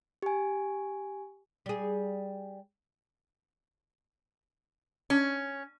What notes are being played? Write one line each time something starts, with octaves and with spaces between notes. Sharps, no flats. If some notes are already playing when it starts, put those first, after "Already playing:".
G4 G#5
G3 G#4
C#4